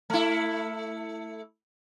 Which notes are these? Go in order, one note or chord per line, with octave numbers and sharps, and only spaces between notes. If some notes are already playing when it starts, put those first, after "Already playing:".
A3 E4